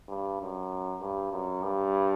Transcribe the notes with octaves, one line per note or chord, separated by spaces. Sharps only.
G2
F#2
G2
F#2
G2